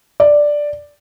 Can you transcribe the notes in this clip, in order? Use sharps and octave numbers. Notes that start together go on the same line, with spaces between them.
D5